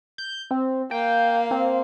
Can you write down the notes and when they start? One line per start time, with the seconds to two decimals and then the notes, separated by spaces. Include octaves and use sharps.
0.18 G6
0.51 C4
0.91 A#3 F5 G5
1.51 C4